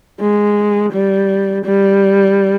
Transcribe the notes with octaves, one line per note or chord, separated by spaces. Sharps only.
G#3
G3
G3